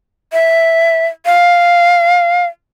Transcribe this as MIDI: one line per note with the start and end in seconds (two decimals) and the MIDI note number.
0.33 1.07 76
1.26 2.46 77